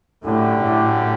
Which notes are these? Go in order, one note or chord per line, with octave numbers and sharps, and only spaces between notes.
F#2 A2 D3 G3 D4 G4
A2